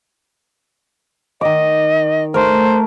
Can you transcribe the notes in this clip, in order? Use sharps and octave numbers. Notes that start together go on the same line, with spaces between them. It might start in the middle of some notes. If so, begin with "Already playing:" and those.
D#3 D#5 D6
A3 A#4 C5